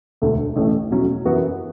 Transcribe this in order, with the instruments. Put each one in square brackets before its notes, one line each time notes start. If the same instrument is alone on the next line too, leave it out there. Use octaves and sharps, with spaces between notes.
[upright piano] E1 D2 D3 A3
A1 A2 E3 A3 C#4
E2 B2 F#3 C#4
F#2 E3 B3 F#4